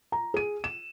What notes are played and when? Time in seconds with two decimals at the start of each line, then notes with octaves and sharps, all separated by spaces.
0.12 A#5
0.34 G#4 D#7
0.64 E7